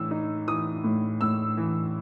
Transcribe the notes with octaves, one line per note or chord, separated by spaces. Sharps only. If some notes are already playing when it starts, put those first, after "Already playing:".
Already playing: A2 E3 E6
D#4
E3 D#6
A2
A2 E6
E3